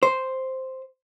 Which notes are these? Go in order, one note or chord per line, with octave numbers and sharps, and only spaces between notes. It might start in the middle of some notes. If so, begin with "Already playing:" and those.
C5